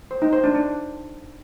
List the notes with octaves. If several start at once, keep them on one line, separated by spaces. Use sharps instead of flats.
C5
D#4
C5
D4
D4